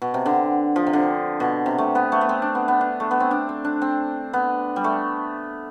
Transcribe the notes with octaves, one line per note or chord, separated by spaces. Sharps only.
B2
C3
D3
F3
C3
D3
B2
C3
A3
B3
A3
B3
C4
D4
B3
B3
D4
A3
B3
C4
D4
C4
D4
C4
B3
G3
A3